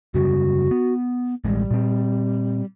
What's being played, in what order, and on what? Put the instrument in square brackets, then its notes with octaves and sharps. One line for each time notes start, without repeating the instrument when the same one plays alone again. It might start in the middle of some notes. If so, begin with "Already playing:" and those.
[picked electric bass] F#2 C#3 G3 [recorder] F#4
[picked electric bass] B3
[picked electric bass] A1 G#3 [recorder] G3
[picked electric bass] A#2 C4